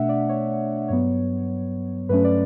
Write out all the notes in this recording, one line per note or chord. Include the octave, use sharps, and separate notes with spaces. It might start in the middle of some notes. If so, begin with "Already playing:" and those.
Already playing: B2 A3 D4 E5 F#5
D5
C#5
G2 F#3 B3 C#5
G2 F#3 A3 C#4 B4
D5